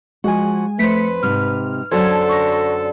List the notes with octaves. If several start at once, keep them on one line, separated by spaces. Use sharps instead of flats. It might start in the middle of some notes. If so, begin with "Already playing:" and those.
F3 G#3 F#4 G#5
F2 A3 B4 C5 B6 C#7
G#2 C3 F6
F#2 D3 F#4 A4 C5 A5 G#6
C#6 A#6